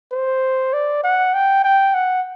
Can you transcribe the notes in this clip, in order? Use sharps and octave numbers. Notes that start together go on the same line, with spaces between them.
C5
D5
F#5
G5
G5
F#5